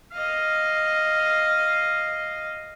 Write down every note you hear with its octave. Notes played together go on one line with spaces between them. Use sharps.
D#5 F5